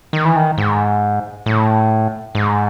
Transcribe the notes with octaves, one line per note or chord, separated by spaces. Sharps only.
D#3
E3
D#3
G#2
A2
G#2